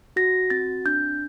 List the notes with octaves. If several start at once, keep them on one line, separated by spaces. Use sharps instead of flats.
F#4 A#6
C4 A6
D4 G6